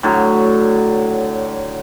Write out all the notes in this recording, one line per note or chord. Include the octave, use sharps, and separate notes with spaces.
A2 D3 F#3